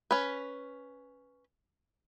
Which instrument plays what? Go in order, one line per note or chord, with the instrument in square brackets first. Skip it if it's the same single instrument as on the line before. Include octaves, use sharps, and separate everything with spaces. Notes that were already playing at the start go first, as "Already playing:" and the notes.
[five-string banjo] C#4 B4